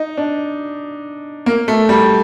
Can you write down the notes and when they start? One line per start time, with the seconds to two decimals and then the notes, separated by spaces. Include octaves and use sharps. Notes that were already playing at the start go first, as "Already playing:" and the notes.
Already playing: D#4
0.17 D4
1.46 A#3
1.68 A3
1.89 G3